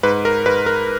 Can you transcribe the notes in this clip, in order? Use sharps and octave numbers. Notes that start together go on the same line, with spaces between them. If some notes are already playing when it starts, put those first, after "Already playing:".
G#2 B4
A#4
G#2 B4
A#4